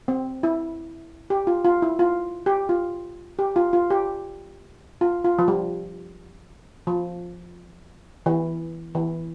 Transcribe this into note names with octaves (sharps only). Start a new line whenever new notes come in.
C4
E4
G4
F4
F4
E4
F4
G4
F4
G4
F4
F4
G4
F4
F4
F3
G3
F3
E3
E3